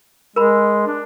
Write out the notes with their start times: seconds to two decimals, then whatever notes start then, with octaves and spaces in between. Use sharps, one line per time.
0.36 G#3 A#4 B5
0.87 D4